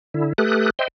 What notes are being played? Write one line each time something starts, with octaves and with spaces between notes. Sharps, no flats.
D3 E4
A3 G4 A4 B4 D#6 F#6
C5 D#5 E5 G5 C6